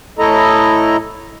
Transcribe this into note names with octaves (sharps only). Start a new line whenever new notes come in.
A2 A3 E4 A4 D#5 A#5